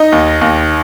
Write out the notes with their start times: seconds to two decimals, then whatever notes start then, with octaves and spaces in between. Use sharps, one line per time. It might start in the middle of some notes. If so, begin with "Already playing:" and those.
Already playing: D#4 D#5
0.12 D#2
0.41 D#2